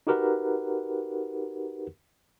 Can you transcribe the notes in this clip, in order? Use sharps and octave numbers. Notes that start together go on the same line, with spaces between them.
D#4 F#4 G4 A#4 B4 F#5